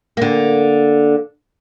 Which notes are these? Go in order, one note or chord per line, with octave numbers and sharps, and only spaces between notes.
D3 A#3